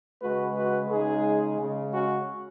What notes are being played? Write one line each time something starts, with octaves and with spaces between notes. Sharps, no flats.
C#3 G#3 F#4 B4
F#4 B4
C#3 G#3 D#4 G#4
C#3 G#3
C#4 F#4